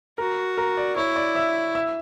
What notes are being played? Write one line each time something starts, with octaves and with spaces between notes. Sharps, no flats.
F#4 A#4 A#5
A#4 A#5
D5
E4 C#5 C#6
D5 D6
E5 E6
E5 E6